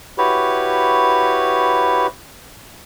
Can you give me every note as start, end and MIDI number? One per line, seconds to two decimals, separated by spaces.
0.18 2.07 64
0.18 2.07 66
0.18 2.07 67
0.18 2.07 71
0.18 2.07 73